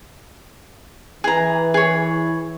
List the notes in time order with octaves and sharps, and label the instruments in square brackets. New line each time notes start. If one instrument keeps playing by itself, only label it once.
[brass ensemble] E3 [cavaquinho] G#4 A#5
[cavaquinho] G#4 C#5